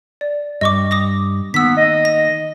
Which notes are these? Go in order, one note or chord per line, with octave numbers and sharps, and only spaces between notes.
D5
G2 G3 D#5 C#6 D6
D6 D#6 A#6
D#3 A#3 B3 E6 B6
D#5
A#6